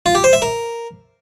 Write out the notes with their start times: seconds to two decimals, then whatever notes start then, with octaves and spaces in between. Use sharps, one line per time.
0.06 F4
0.15 G4
0.24 C5
0.33 E5
0.42 A#4